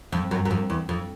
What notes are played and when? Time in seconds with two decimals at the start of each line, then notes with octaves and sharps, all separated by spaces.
0.12 F2
0.31 F#2
0.45 F#2
0.51 F2
0.70 E2
0.89 F2